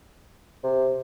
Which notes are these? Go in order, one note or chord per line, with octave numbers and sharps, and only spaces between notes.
C3